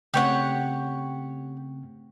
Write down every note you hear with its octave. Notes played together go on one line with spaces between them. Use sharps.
C#3 A3 C4 G4 C#5 F#5